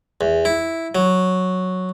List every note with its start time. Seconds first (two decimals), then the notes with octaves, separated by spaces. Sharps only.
0.21 E2
0.45 E4
0.95 F#3